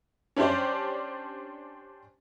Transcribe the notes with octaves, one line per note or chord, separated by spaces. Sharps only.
C#4 D4 G4 C5 D5